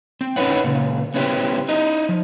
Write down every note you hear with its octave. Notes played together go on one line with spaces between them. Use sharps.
C4
C#4 D#4 E4 B4 C#5 F#5
A#2 C#3
B3 C#4 E4 F4 G4 C5
D#4 E4 D#5
F3